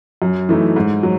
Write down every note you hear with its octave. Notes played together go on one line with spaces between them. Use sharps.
F#2
E3 A3 D#4
G#2
F#3